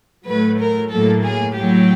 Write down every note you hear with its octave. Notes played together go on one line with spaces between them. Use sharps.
A2 F#3 A3 B4
A#4
A2 F#3 A#3 A4
G#4
A2 F#3 A3 G4